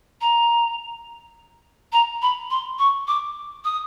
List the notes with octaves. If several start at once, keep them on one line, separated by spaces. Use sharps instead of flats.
A#5
A#5
B5
C6
C#6
D6
D#6